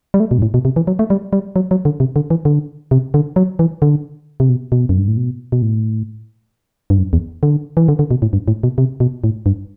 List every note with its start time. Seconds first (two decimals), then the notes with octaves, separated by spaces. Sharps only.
0.14 G3
0.20 A3
0.31 B2
0.38 G2
0.42 A2
0.54 B2
0.65 C3
0.76 E3
0.87 F#3
0.99 A3
1.10 G3
1.33 G3
1.56 F#3
1.71 F#3
1.85 D3
2.00 C3
2.16 D3
2.30 E3
2.45 D3
2.91 C3
3.14 D3
3.36 F#3
3.59 E3
3.82 D3
4.40 C3
4.49 B2
4.72 B2
4.89 F#2
4.98 G2
5.08 A2
5.17 B2
5.52 B2
5.62 A2
6.90 G2
6.98 F#2
7.13 E2
7.43 D3
7.77 E3
7.88 D3
7.99 D3
8.11 B2
8.22 A2
8.33 G2
8.48 A2
8.63 B2
8.78 C3
9.00 B2
9.24 A2
9.46 G2